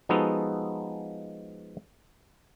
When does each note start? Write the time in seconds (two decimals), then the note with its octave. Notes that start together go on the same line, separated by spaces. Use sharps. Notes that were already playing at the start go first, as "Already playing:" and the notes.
0.09 F3 G#3 B3 D#4 F#4 A4